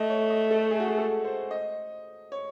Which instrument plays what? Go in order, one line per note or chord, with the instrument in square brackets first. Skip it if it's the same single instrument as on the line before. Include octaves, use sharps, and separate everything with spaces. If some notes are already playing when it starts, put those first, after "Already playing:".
Already playing: [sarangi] A3 [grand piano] D#5
[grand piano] C#5
D#5
A4
G#4
F#4
G#4
A4
C5
D#5
C#5